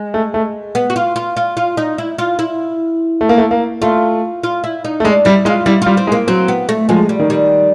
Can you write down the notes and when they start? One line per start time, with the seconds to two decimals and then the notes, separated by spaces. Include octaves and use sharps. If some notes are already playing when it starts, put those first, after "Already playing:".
Already playing: G#3
0.14 A3
0.34 A3
0.75 B3
0.90 F#4
0.96 F4
1.16 F4
1.37 F4
1.57 F4
1.77 D#4
1.98 E4
2.19 F4
2.39 E4
3.21 A3
3.29 A#3
3.38 A3
3.51 A#3
3.82 A3 F4
4.44 F4
4.64 E4
4.85 D#4
5.00 A3
5.05 G#3 D4
5.25 G3 E4
5.45 G#3 F4
5.66 G3 E4
5.82 G3 F4
5.97 C4
6.07 G#3
6.12 A#3
6.27 F#3 C4
6.48 B3
6.69 A3
6.89 F3 G#3
7.09 G3
7.19 D#3
7.30 G3